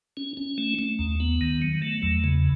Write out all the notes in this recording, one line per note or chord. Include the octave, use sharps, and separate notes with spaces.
C#4
C#4
A3
A3
D#2
B3
D#3
F#3
A3
E2
C#3